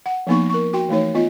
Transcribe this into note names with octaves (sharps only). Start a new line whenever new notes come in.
F#5
F3 A#3 B3 D#4 C#6
A#4 C#6
F#4 G5 C6
E3 A3 D#4 C#5
B3 F4 D#5